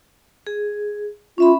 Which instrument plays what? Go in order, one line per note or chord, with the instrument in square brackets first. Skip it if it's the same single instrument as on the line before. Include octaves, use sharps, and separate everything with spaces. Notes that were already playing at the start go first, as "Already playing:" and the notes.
[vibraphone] G#4
[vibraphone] C#4 E5 B5 [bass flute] F4